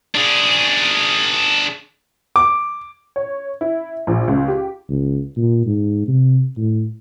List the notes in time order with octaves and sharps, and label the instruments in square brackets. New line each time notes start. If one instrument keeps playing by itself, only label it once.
[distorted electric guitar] D4 G#4
[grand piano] D6
[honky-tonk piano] C#5
E4
A#1
C#2
G4
[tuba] C#2
A#2
G#2
C3
A2